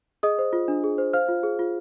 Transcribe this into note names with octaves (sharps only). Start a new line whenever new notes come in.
G#4 D#5 D#6
C5
F4
D4
G#4
C5
C5 F5 F6
F4
G#4
F4